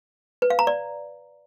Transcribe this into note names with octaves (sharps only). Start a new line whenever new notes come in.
B4
F5
A#5
D5